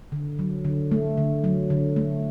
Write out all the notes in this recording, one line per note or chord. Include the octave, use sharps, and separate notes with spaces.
D3
F#3
D3
A3
D3
F#3
D3
A3